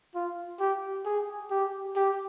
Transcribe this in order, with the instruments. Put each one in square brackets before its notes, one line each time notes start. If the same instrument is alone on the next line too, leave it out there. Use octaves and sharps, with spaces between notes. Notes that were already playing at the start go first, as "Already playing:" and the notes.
[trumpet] F4
G4
G#4
G4
G4